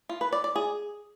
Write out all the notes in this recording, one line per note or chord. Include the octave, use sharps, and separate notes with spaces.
F4
B4
D5
D5
G#4